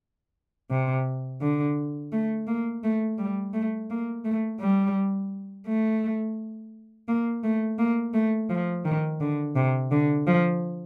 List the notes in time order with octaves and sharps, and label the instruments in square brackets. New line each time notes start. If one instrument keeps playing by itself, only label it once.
[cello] C3
D3
A3
A#3
A3
G3
A3
A#3
A3
G3
A3
A#3
A3
A#3
A3
F3
D#3
D3
C3
D3
F3